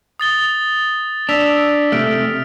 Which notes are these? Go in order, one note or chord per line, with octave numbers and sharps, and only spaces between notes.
D#6 A6 G7
D4 E6 B6 F7
C3 A3 F6 D7